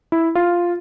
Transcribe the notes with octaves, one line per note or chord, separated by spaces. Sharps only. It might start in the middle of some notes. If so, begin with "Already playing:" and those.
E4
F4